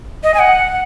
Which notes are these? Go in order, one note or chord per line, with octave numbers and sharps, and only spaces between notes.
D#5
G#5
F#5